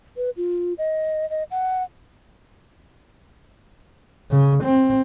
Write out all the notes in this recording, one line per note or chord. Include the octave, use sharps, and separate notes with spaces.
B4
F4
D#5
D#5
F#5
C#3
C4